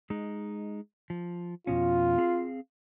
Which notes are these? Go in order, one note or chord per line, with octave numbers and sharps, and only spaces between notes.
G#3 D#4
F3
F2 B2 C#4 F4
C4 G#4 F5